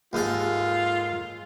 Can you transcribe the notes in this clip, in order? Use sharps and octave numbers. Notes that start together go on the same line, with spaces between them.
D#2 G#2 F4 A4